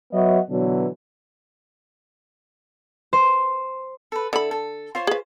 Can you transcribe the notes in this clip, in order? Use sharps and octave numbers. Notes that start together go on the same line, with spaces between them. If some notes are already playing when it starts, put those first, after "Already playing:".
F#3 B3 F#4 C#5 D#5 E5
B2 D3 E3 F#3
C5
A4 B4
D3 E4 A4 B5
A4
F4 C5 C#5
G#4 B4